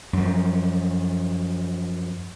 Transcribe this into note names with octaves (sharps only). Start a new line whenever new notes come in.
F#2 F3